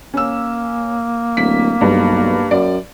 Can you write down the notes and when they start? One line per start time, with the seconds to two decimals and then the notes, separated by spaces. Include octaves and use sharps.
0.14 A#3 C#4 E6
1.37 D1 B6
1.81 B1 G2
2.51 F#2 D5